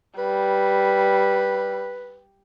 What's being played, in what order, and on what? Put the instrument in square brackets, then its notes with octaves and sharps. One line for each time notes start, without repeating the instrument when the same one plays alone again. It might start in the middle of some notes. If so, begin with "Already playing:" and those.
[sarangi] G3 [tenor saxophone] B4